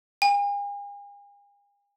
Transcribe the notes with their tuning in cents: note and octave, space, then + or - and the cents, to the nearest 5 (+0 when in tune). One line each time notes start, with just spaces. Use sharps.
G#5 -45